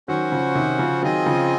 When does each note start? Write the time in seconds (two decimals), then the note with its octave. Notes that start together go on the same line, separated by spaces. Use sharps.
0.08 D#3 F#3 C#4 F#4 C5 F#5
0.32 C#3 F3
0.55 C3 D#3
0.79 C#3 F3
1.02 D#3 F#3 C4 F4 G#4 D#5 G#5
1.26 C#3 F3